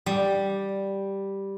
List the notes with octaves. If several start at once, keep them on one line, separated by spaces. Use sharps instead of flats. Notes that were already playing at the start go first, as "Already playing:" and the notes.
G3